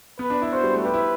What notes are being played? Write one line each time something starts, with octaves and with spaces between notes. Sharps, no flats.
B3 B4
D4
E4
F#4 C5
G3
A3
G4 B4
E4